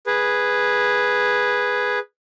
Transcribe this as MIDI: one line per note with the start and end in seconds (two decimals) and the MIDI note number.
0.06 1.99 68
0.06 1.99 71